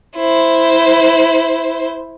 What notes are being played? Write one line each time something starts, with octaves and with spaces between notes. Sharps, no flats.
E4 C5